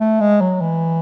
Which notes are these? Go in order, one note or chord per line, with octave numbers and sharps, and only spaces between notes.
A3
G#3
F#3
E3